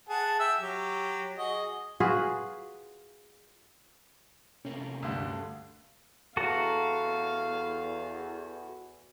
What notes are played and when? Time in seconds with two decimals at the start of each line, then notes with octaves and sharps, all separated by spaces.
0.09 G#4 F#5 A5
0.40 E5 G5 E6
0.60 F#3 G4
1.38 F#4 G#4 D#5
2.00 F4 F#4 G#4 B4
4.65 C3 A3 A#3 C#4
5.03 D2 G2 D3
6.37 E2 F#4 A4 F5 A#5